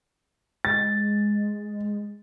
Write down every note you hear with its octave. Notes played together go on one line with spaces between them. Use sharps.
G#3 A6